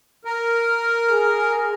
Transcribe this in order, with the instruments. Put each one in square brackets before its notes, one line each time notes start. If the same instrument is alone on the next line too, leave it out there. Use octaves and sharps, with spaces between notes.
[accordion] A#4
[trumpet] G#4